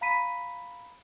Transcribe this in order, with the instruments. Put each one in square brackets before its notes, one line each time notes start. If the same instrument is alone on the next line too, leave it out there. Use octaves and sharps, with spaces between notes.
[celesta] F5 A#5 B5 B6 D#7